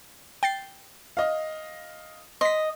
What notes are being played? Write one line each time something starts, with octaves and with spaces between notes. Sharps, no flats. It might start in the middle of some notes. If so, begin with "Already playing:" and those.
G5 A6 C7
D#5 F5
D#5 C6 B6